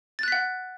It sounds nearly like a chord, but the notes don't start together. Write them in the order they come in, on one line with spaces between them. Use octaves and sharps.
A6 F#6 B6 F#5